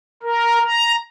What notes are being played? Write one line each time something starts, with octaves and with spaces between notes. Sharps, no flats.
A#4
A#5